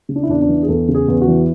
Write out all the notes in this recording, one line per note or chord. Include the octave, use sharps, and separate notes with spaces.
C#3
D4
E4
E2 D4
D4
E3
G#4
E2 A4
C#3
G#4
E2
F#4
E3